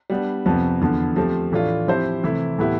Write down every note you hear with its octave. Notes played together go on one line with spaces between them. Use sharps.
G3 B3 D4
F2 C3 F3 B3
E2 D3 F3 B3
F3 A3 C4 G4
A2 E3 A3 D4 F4
F3 C4 E4 G4 C5
C3 E3 A3 E4
A2 E3 B3 E4 G4